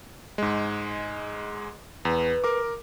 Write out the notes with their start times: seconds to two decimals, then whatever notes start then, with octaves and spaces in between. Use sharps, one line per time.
0.38 G#2 G#3
2.05 E2 B4
2.44 A#4 D6